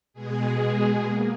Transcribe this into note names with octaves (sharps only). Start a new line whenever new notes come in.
B2 G#3 G#4
A#3